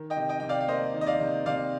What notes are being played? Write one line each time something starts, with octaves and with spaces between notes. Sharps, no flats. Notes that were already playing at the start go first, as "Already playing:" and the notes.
Already playing: D#3
D#5 G5
C3
D#5 G5
C3 G5
D5 F5
F5
A#3 C5 D#5
D#3
D#5
D5 F5
C3
C3 D5 F5